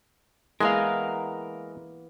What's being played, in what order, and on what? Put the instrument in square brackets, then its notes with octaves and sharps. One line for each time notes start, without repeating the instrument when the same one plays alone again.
[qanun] E3 A#3 B3 [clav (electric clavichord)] G#3 [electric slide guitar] A#4 F5